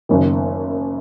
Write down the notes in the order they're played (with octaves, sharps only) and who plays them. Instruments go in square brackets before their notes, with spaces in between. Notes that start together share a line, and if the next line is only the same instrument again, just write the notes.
[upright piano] F#1 F#2 D#3